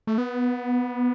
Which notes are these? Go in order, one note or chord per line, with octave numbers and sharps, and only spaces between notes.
A3
B3